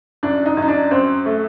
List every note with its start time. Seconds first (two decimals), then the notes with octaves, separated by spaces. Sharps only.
0.23 F#2 D4
0.46 D#4
0.57 F#2
0.62 D#4
0.68 D4
0.91 F#2 C4
1.26 A3